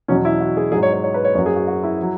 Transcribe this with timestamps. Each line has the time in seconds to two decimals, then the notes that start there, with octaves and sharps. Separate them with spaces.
0.08 E2 B2 F#3 C#4
0.25 E4
0.41 F#4
0.57 G#4
0.72 G#2 F#3 G#4
0.83 C#5
0.93 C#5
1.04 C#5
1.14 B4
1.25 C#5
1.35 F#2 C#5
1.39 F#3
1.46 G#4
1.56 F#4
1.67 F#4
1.84 E4
2.02 F#3